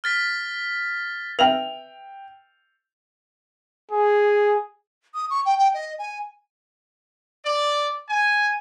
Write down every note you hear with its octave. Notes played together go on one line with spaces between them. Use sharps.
F6 A6 B6
B4 E5 G5 F6 F7
G#4
D#6
C#6
G5
G5
D#5
G#5
D5
G#5